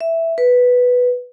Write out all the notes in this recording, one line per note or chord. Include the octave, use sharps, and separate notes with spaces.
E5
B4